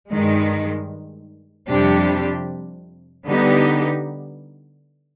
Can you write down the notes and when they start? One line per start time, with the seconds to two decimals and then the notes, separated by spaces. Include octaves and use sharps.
0.10 G2 D#3 G#3
1.68 F2 C3 G3 D4 G4
3.25 D3 G3 B3 D#4 G4